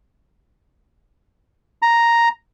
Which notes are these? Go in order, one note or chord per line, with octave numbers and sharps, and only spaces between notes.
A#5